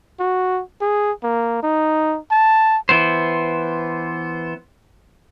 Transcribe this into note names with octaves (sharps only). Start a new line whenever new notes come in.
F#4
G#4
A#3
D#4
A5
E3 B3 C5